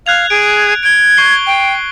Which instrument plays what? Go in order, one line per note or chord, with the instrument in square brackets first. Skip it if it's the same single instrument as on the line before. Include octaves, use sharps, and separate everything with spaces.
[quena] F5 [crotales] F#6 G#6 F7
[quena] G#4 [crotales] D7
[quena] G#6 [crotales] D7 G7
[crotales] C#6 C7 G7
[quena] G5